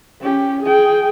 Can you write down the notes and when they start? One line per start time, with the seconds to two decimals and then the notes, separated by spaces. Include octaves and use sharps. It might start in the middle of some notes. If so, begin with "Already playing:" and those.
0.21 C#4 G4
0.63 G#4 G5